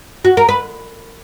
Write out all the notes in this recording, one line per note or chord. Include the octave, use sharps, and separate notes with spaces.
F#4
A#4
B4